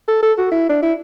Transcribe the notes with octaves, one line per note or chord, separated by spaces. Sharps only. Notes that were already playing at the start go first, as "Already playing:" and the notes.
A4
A4
F#4
E4
D4
E4